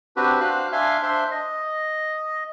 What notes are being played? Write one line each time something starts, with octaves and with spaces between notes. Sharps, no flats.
C4 D4 F#4 G4 B4
D4 F#4 C5 F5 F#6
D4 E5 F5 G#5 C6
D4 C5 E5 C6
D#5